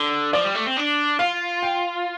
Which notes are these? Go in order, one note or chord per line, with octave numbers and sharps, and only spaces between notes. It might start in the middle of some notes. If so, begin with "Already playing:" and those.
Already playing: D3
F3 D5
G3
A3
C4
D4
F4 F5
G5